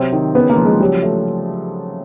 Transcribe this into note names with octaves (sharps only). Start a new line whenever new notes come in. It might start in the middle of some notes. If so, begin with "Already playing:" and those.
Already playing: C3 F#3 C4
D#3
C#3 B3
A#3
F3
G#3
F#3 G3
A3